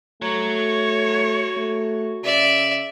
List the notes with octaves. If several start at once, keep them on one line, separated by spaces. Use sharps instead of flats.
A3 F#4 C#5 A#5
A3
C#3 D5 E5